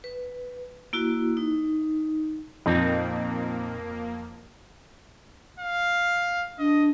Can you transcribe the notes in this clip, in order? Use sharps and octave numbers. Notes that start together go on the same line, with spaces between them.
B4
A#3 E4 F#4
D#4
F2 A#2 A#3 C4 D#4
F5
D4 D#5